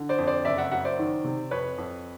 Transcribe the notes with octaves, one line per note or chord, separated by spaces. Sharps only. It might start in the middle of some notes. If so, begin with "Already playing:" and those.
Already playing: D3
C5 D5
F2
C5 D5
F#1 D5 E5
E5 F#5
F#3 E5 F#5
C5 D5
D#3
C3
F2 B4 C#5
F2